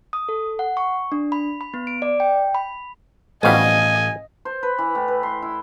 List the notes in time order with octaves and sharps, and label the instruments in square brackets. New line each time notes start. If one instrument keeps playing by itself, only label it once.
[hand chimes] D#6
A4
F#5
C#6
D4
B5
B5
B3
D7
D5
G5
B5
[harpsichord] A1 F5 [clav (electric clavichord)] F2 B2 G3 [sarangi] D#5 [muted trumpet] G#5
[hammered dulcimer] C5
B4
E3
A2
B4
C6
E4